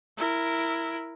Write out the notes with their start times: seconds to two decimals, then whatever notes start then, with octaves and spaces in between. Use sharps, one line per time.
0.17 E4 A#4